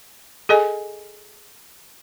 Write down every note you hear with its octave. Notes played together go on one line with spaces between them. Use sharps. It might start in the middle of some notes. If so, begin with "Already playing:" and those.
G#4 A4 D#5 G#5